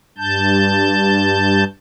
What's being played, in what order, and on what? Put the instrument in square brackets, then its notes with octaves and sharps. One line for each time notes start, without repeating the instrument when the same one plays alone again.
[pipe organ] G2 A5 G6